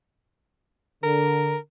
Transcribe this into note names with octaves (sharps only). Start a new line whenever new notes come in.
D3 A#4